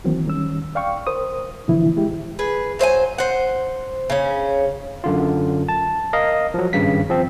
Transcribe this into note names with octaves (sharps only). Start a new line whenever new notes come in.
D#3 E3 F#3 A#3 C4
D#3 G3 C#4 E6
D5 F5 G5 C#6
A#4 C5 D#6
A#2 D3 E3 F3 E4
G#3 E4 G4
G#4 B4
F#3 C5 E5 G#5
C5 F#5
C#3 C#4
F#2 D3 F4
A5
A#4 D#5 F5
F3 F#3
G#1 G2 C#3 B6
F3 C4